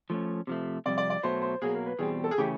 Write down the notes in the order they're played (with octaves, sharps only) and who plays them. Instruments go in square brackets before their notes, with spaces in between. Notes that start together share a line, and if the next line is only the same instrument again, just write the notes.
[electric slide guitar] F3 A3 C#4
C3 F3 A3
[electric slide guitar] F2 C3 G3 [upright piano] D5
[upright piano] D5
D5
[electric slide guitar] B2 F#3 A3 [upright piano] C5
[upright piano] C5
[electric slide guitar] B2 F#3 A#3 [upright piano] G#4
[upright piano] A#4
B4
[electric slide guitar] E2 B2 G3 C4 [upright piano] G#4
[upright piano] A4
G#4
[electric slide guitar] C#3 E3 A3 C#4 [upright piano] G4